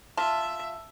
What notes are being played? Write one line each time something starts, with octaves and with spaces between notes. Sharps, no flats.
F4 E5 A5